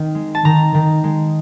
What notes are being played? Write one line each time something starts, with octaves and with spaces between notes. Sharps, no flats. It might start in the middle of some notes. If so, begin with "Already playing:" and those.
Already playing: D#3 C4
G#3
A5
D#3 A#5
D#3
G#3